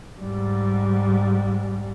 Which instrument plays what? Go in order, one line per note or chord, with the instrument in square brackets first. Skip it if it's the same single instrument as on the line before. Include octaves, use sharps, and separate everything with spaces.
[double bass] G#2 G3